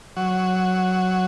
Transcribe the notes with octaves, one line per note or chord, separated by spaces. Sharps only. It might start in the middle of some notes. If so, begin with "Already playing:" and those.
F#3